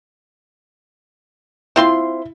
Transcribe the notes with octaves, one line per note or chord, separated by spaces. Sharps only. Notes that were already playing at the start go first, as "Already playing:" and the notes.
C4 E4 F4 C6